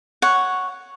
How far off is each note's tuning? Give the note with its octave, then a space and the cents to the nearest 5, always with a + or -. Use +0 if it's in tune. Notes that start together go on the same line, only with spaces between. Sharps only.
C#5 +0 F#5 +0